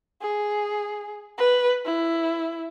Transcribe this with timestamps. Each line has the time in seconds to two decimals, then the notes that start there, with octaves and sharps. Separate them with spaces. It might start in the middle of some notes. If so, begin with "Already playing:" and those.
0.22 G#4
1.38 B4
1.85 E4